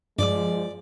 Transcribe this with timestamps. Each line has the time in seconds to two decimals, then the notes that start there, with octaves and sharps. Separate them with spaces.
0.19 G2 F3 G#3 D5 D6